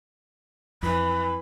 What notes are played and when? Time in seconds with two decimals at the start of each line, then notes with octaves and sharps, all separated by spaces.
0.83 F2 E3 B5